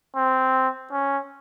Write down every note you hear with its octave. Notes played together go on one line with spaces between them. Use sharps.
C4
C#4